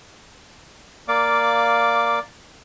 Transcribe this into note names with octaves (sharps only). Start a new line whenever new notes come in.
A#3 D5 F5 D6